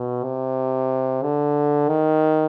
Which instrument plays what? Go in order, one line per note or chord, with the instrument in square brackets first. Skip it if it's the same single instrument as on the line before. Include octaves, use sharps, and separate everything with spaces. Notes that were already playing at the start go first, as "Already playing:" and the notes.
Already playing: [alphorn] B2
C3
D3
D#3